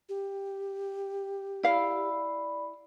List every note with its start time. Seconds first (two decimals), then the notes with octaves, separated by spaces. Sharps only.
0.09 G4
1.63 E4 D5 F5 B5